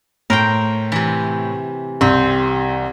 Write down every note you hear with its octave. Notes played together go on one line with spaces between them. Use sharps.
A2 A#4 C5 G5
C3 E3
C2 C4